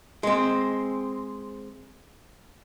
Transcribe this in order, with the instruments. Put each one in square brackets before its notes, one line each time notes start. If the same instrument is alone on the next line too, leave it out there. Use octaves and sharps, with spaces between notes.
[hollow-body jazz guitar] G#3 C4